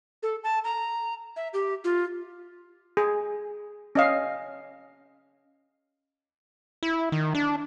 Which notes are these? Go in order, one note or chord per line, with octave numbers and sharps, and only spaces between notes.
A4
A5
A#5
E5
G4
F4
G#4
C#4 D#5 F5
E4
D#3
D4